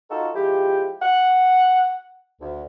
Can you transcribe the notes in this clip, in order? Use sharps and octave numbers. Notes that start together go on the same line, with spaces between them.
D#4 F4 F#4 A4
F3 G#3 E4 G4
F#5
D2